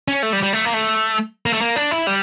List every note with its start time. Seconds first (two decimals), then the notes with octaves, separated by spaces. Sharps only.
0.08 C#4
0.23 A3
0.33 G3
0.43 G3
0.53 A3
0.65 A#3
0.74 A3
1.46 A#3
1.53 A3
1.61 A#3
1.76 D4
1.91 E4
2.07 G3